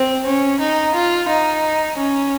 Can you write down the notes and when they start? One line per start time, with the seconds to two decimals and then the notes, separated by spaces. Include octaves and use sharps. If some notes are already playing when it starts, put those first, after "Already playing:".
Already playing: C4
0.26 C#4
0.59 D#4
0.94 F4
1.28 D#4
1.97 C#4